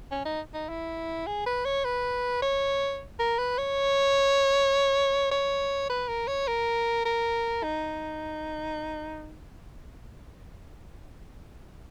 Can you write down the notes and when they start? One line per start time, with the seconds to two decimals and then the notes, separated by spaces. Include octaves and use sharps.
0.11 C#4
0.26 D#4
0.54 D#4
0.69 E4
1.27 G#4
1.46 B4
1.65 C#5
1.85 B4
2.42 C#5
3.19 A#4
3.39 B4
3.58 C#5
5.31 C#5
5.90 B4
6.09 A#4
6.28 C#5
6.47 A#4
7.05 A#4
7.63 D#4